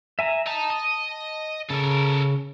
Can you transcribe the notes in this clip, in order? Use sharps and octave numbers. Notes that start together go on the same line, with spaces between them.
E5 G#5 A#5
D#5 A5 A#5
D#5
C#3 A4 A#4